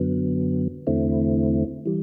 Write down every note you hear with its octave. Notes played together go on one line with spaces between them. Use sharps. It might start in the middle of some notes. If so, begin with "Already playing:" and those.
Already playing: F#2 D3 F#3 B3
E2 D3 A3 C4 E4
E3 G3